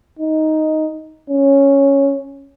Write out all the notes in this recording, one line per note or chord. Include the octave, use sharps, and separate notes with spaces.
D#4
C#4